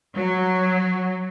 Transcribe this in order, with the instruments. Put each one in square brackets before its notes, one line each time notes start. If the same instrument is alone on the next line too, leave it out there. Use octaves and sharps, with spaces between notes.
[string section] F#3